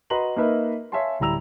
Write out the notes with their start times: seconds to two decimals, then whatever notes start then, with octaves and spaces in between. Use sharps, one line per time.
0.10 F#4 B4 D#5 A#5 C6 F#7
0.36 A#3 D#4 A#4 B4 D#5 E5
0.92 C#5 E5 F5 G#5 A5 C6
1.20 D1 G3 E4 A#5 E6 F7